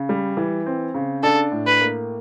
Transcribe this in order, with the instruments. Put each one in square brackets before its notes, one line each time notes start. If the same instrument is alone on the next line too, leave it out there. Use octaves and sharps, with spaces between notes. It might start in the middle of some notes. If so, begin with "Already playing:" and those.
Already playing: [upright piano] C#3
G3
E3
C4
C#3
[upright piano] D4 [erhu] A4
[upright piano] A2
[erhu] B4
[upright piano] A#3